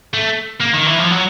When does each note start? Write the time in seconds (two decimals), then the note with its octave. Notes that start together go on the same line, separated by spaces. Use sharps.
0.14 A3
0.61 A#3
0.74 D#3
0.87 E3
0.99 F3
1.11 F#3